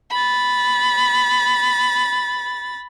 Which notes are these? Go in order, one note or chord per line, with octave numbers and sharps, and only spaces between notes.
B5 A6